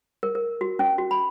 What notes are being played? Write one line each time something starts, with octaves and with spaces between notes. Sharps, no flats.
A#4
A#4
F#4
C#4
F#4
B5